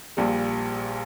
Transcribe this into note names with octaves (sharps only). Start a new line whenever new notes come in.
A#1 A#2 G3